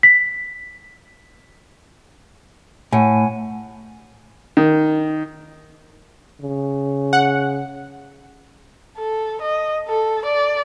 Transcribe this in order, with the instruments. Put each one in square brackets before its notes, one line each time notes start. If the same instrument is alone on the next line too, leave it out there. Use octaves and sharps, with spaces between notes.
[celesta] B6
[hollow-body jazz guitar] A2 [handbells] F#5 G#5
[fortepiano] D#3
[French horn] C#3
[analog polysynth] F#5
[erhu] A4
D#5
A4
D5